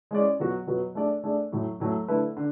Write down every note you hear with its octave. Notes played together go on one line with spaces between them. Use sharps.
G#3 C#4 E4 G#4 D5
B2 F#3 B3 F#4
B2 F#3 B3 F#4
A3 D4 G#4 D5
A3 D4 G#4 D5
A2 F#3 A3
A2 F#3 A3
D3 A3 E4 B4 E5
D3